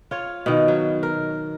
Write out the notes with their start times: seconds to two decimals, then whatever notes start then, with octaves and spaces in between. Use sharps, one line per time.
0.11 F4 C#5
0.46 B2 D#3
0.68 F#3
1.03 A#4